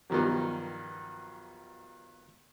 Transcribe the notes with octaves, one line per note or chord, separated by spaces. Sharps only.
G2 B2 D#3 F3 F#3